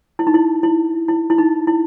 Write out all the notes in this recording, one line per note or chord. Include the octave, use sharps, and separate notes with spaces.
E4
D#4
E4
E4
E4
E4
D#4
E4